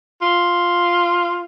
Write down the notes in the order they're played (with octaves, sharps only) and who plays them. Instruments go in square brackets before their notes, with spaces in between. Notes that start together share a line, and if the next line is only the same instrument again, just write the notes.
[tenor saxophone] F4